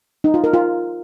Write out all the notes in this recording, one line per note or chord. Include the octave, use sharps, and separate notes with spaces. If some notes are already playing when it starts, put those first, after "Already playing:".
D#4
F4
A#4
F4